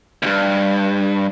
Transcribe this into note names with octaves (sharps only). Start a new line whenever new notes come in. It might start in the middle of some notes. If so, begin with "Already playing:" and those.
D2 G2